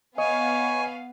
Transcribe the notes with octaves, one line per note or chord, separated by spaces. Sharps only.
B3 C#5 D#5 F5 G#5